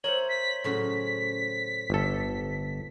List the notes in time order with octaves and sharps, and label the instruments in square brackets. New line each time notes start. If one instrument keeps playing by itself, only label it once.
[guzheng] A#4 E5 [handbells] C5 C#5 [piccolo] F#7
[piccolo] B6
[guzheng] A2 C#3 F#3 [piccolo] B6
[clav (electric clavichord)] G1 A4